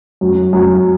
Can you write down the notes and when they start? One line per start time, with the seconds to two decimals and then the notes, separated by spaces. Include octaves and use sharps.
0.21 F#2
0.53 F#2